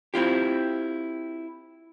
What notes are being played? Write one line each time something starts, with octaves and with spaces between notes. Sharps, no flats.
C4 E4 F4 G4